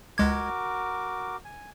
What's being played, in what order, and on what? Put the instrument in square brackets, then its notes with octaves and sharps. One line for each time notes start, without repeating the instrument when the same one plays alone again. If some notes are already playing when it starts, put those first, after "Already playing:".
[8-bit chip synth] C#2 G#3 G#6 [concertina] F#4 A#4 D6
[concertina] G#5